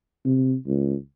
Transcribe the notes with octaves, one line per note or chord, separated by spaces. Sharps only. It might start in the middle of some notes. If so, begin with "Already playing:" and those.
C3
C#2